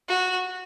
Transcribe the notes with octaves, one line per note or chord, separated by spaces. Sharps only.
F#4